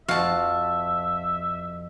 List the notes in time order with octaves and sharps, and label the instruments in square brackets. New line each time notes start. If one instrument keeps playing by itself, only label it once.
[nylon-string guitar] F2 [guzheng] F3 F#4 [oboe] E5 [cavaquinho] F5 A5